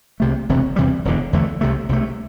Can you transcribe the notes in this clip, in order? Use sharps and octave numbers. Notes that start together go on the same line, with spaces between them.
C2 C3 A3
E1 D2 C3
E2 C3 E3 G3
E1 E2 D3
E2 D3 A3
C2 C3 A3
C2 C3 A3